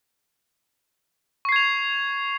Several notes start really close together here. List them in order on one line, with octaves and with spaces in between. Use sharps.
C#6 C7 G#6 F7